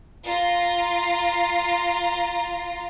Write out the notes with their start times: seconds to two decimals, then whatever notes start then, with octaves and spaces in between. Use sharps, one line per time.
0.24 F4 A#5